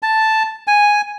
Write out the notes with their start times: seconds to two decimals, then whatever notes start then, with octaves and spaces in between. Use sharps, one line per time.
0.03 A5
0.67 G#5